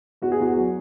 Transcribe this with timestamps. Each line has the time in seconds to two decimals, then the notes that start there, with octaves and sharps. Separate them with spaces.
0.22 E2 F#4
0.32 G#4
0.40 E2 F#4
0.57 F#3